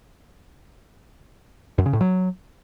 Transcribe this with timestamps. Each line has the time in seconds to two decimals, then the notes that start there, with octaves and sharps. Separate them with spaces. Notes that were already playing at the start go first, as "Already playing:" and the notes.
1.78 F#2
1.86 C#3
1.93 A2
2.01 F#3